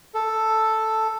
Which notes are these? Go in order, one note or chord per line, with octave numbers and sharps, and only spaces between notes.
A4